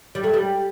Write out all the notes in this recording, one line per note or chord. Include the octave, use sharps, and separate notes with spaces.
G3
A3
G3